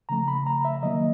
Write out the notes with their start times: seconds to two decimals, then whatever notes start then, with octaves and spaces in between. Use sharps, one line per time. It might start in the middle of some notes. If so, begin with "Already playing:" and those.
0.09 C#3 F3 A3 A#5
0.28 B5
0.47 A#5
0.65 E5
0.83 D#3 F#3 A#3 D#5